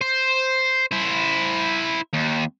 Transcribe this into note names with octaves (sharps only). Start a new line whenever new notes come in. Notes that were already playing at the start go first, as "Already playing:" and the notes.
C5
E4 C5
D#2